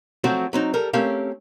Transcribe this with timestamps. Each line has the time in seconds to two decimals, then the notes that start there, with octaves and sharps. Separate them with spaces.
0.24 F3 F#3 A3 C4 F#4
0.53 F#3 C4 D#4
0.74 G3 A4 A#4
0.93 A3 C4 C#4 G4 A#4 F5